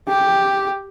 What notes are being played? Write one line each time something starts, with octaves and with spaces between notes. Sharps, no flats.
G4